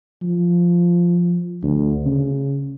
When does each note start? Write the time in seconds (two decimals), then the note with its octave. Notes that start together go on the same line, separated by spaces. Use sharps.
0.22 F3
1.63 D2
2.06 C#3